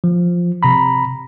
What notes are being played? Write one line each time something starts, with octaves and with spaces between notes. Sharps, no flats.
F3
C3 A#5 B5